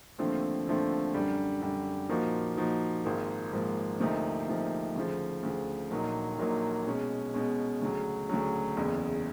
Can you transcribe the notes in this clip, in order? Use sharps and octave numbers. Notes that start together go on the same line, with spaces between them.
D#2 D3 F3 A3 C4
D#2 D3 F3 A3 C4
F#2 D3 G3
F#2 D3 G3
A#2 F3 A#3 D#4 F#4
A#2 F3 A#3 D#4 F#4
G#1 G#2 F3 A#3
G#1 G#2 F3 A#3
D2 C3 F3 A#3 D#4
D2 C3 F3 A#3 D#4
D2 C#3 F3
D2 C#3 F3
A#1 A#2 F#3 A#3 D#4
A#1 A#2 F#3 A#3 D#4
B2 G#3 C#4
B2 G#3 C#4
D2 C#3 F#3
D2 C#3 F#3
F#1 E2 C#3